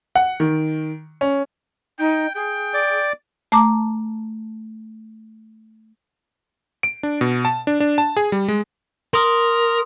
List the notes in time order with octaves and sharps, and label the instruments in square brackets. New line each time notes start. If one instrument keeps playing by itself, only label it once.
[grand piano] F#5
D#3
C#4
[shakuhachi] D#4 [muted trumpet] G5
[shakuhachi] G#4 [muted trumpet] G5
[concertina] D5
[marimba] A3 A5 A#5 D6
[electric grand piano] D7
D4
B2
A5
D4
D4
A5
G#4
G3
G#3
[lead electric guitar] A#4 [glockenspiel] C6 D#6